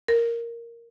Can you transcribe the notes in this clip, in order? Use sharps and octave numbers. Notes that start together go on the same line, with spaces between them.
A#4